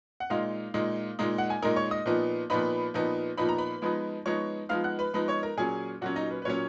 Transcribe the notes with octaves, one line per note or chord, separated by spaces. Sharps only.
F#5
A#2 G#3 D#4 F4 F5
A#2 G#3 D#4
A#2 G#3 D#4
F#5
G#5
A#2 G#3 D#4 A#4 A#5
C#5 C#6
D#5 D#6
A#2 F3 B3 D#4
A#2 F3 B3 D#4 B4 B5
A#2 F3 B3 D#4
A#2 F3 B3 D#4 B5
A#5
B4 B5
F3 G#3 B3 D#4
F3 G#3 B3 D#4 C#5 C#6
F3 G#3 B3 D#4 F5 F6
F#5 F#6
B4 B5
F3 G#3 B3 D#4 B4 B5
C#5 C#6
A#4 A#5
A#2 F#3 C#4 G#4 G#5
A#2 F#3 C#4 F#4 F#5
D#4 D#5
B4
B4
A#2 F#3 C#4 C#5